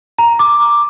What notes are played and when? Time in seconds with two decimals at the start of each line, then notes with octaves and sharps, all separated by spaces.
0.19 A#5
0.39 D6